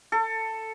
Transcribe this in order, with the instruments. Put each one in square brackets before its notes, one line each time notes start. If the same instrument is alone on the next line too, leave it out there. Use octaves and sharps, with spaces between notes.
[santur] A4